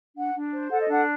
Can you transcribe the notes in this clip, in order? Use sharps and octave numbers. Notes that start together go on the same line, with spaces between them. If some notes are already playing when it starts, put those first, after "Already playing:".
D4 F#5
D4
C5
A4 F#5
D#5
D4 F#5